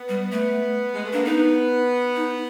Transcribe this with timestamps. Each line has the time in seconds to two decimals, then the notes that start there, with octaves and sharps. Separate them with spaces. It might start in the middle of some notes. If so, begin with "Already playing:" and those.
Already playing: B3
0.09 G3
0.32 A3
0.94 G#3
1.05 A3
1.13 A#3 D4
1.25 B3 D#4
2.16 D#4